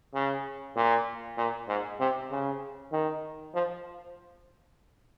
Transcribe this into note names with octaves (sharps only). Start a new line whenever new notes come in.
C#3
A#2
A#2
G#2
C3
C#3
D#3
F3